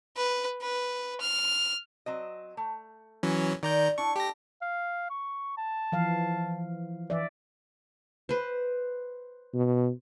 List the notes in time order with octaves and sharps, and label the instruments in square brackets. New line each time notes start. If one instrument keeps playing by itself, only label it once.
[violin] B4
B4
F6
[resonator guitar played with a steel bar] F#3 C4 D#5
A3
[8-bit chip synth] E3 F#3 C#4
[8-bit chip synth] D#3 A#5 G6 [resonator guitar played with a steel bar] D5
[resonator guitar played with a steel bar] D4 E4 [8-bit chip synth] C#6
[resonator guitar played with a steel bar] A3 [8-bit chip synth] G4 A#6
[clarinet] F5
C#6
A5
[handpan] E3 F3 F5
[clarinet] E3 [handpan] D5 E5
[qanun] B4 C5
[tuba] B2